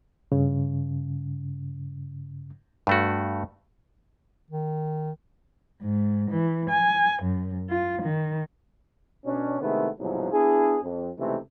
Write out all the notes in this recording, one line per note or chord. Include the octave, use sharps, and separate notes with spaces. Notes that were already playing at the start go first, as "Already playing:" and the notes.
G2 C#3
G2 A3 F#4
D#3
G#2
E3
G#5
F#2
F4
D#3
B2 C#4 D4
C3 D#3 G#3 A3 B3 E4
C2 G#2 B2 F3 F#3
B3 D4 E4 G#4
F2
C#2 C3 E3 A3 D#4